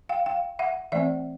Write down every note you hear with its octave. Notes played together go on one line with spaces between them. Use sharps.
F5 G5
F5 G5
E5 F#5
E3 A3 C4 D5 E5